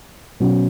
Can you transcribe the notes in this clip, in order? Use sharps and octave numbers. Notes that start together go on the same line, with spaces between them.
B2 F#3 C#4